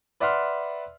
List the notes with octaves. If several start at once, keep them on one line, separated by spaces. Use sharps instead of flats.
B4 D5 E5 F#5 C6 F6